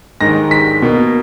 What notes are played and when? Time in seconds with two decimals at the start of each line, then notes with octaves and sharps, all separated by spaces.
0.21 G#2 D#3 G#3 A#6
0.51 B6
0.82 B2 A#3